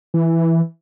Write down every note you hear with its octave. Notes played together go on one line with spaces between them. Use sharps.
E3